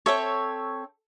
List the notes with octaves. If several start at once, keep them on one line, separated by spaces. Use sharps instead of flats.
C4 A4 C#5 E5